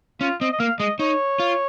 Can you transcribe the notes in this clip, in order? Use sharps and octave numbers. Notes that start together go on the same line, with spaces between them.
C#4 F4
C4 D#5
D#5
A#3 F5
G#3 D#5
D#4 C#5
F4